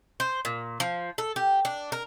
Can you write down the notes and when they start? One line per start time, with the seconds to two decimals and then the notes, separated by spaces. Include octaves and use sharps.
0.20 C5
0.45 A#2
0.80 F3
1.18 A4
1.36 G4
1.65 D4
1.92 A#4